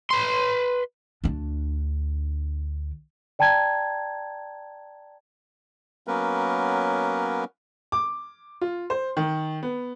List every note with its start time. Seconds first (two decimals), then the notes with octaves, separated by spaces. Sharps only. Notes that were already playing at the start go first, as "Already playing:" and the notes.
0.11 B4 C6
1.24 D2 D4
3.39 D5 G5 A5 A#5 G#6
6.08 F#3 A#3 B3 C#4 A#4 B4
7.92 D6
8.61 F4
8.90 C5
9.17 D#3
9.63 B3